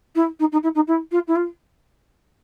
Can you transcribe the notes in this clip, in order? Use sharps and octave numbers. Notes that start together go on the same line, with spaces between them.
E4
D#4
D#4
E4
D#4
E4
F4
E4
F4